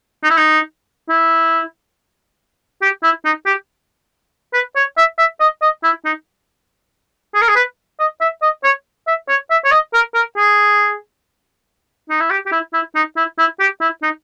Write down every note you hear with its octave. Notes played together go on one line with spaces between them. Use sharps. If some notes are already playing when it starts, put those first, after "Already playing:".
D#4
E4
D#4
E4
G4
E4
D#4
G4
B4
C#5
E5
E5
D#5
D#5
E4
D#4
G#4
A#4
G#4
B4
D#5
E5
D#5
C#5
E5
C#5
E5
C#5
D#5
A#4
A#4
G#4
D#4
E4
G4
G4
E4
E4
D#4
E4
E4
G4
E4
D#4